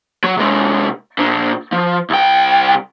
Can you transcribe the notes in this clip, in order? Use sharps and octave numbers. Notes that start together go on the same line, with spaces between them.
F#3
C3 G#3
A#2 D4
F3
C2 G5